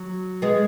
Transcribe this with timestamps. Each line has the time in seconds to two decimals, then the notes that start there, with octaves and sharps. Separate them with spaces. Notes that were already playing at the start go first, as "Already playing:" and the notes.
Already playing: F#3
0.42 G#3 B3